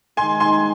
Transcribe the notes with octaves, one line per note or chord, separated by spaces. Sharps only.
D#3 G#3 D#4 G#5 C6
G#5 C6